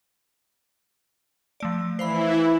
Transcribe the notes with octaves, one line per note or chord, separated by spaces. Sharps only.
F3 A3 D5
E3 E4 C5 F5 B5